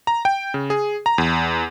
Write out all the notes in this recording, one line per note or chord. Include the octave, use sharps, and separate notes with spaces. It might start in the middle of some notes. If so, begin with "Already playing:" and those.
A#5
G5
C#3
G#4
A#5
E2